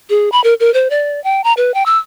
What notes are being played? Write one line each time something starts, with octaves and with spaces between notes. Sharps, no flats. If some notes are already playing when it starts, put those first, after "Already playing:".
G#4
B5
A#4
A#4
C5
D5
G5
A#5
B4
G5
E6